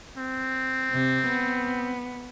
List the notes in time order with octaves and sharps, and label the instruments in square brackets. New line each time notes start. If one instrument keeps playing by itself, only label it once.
[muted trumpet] C4
[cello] C3
B3